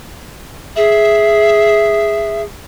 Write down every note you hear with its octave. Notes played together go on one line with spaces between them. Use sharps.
G#4 E5